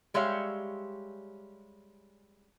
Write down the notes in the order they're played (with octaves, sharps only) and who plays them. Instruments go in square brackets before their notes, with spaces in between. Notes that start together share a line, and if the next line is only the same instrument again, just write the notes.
[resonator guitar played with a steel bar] G3 G#3 G4 C#5 E5 F5